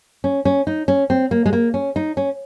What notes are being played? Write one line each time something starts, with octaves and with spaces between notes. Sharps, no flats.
C#4
C#4
D#4
C#4
C4
A#3
G#3
A#3
C#4
D#4
C#4